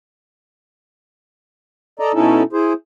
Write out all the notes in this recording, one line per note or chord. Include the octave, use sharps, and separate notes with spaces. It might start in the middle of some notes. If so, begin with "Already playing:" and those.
A4 D5 D#5 A#5
B2 C#4 D#4 E4 A4
E4 G#4 C5